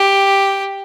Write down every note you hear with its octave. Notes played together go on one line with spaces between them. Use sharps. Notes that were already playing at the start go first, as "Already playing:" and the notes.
Already playing: G4